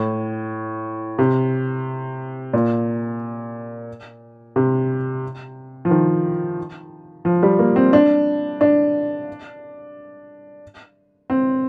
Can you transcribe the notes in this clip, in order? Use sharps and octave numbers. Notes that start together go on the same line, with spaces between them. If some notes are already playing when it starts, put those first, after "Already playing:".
Already playing: A2
C3
A#2
C3
F3
D#3
F3
G3
A#3
C4
D4
D4
C4